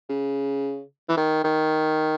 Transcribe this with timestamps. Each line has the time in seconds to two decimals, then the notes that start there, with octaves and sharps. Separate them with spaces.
0.10 C#3
1.09 E3
1.17 D#3
1.44 D#3